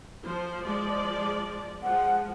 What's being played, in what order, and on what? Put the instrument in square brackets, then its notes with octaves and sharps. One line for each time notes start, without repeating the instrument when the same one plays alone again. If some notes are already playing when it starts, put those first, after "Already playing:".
[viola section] F3 C5
F3 G#3 D5
[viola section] F3 G#3 [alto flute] F#5